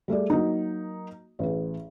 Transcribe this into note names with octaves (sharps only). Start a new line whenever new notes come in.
G3 A3 G#4 D5
F#3 A#3 D#4
A1 G#4